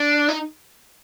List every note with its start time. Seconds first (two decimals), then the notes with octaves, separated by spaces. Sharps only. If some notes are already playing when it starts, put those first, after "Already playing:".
Already playing: D4
0.29 D#4